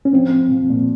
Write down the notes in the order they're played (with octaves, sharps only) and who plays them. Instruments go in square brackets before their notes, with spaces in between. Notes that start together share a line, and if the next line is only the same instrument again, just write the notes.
[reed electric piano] C#4
[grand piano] F3 [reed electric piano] C4
[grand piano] F3
F3
A#2